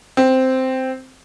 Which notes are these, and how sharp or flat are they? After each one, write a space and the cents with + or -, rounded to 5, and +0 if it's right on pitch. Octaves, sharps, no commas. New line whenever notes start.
C4 -5